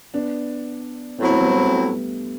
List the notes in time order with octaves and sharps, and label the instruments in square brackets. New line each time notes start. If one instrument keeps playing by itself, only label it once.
[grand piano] B3 D4
[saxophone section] A2 F#3 C4 E4 [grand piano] B3
[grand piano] A3
G3 B3